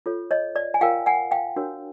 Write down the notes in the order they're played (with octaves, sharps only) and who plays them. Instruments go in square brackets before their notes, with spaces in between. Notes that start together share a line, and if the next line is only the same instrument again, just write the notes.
[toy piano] F4 A4 C#5
C#5 D#5
D5
G#5
F4 A#4 C#5 F5 G5
F#5 G#5
F5 G5
D4 F#4 A#4 C#5